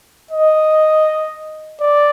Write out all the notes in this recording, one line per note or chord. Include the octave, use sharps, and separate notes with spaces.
D#5
D5